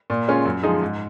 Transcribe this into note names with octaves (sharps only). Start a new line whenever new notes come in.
A#2
G#3 C#4 F4
F#2
F3 G#3 D#4 G#4
G#2